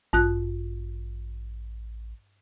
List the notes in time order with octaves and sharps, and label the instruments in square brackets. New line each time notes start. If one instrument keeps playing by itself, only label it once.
[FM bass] A1 [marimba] G2 F4 F#6